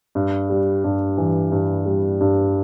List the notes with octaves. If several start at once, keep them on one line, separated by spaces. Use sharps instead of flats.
G2
G3
G2
E3
G2
G3
G2